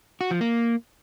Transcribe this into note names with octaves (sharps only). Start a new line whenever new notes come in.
F#4
F3
A#3